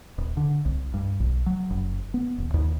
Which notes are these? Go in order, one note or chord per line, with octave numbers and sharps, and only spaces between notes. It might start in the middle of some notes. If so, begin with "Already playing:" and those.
D#1
D3
C2
G2
B1
F#3
F#1
B3
D#1
D#2